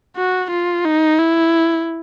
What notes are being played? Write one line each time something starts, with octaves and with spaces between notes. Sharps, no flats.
F#4
F4
D#4
E4